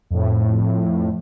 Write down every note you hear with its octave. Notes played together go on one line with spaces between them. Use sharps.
F2 A2